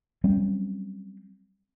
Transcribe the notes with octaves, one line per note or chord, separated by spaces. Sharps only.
F#3 G3 C4 C#4